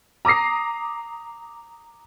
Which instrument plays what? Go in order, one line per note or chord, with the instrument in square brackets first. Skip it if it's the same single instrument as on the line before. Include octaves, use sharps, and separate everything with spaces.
[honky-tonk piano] A#5 D6 D#6 A#6 C7